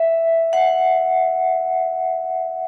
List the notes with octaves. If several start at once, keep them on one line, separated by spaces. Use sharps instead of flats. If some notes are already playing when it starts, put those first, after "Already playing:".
Already playing: E5
F#5